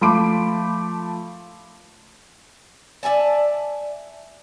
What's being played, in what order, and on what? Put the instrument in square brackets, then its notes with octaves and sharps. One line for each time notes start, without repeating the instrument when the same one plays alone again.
[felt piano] F3 A3 B5 C6 D6 D7
[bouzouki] D5 E5 G#5 A5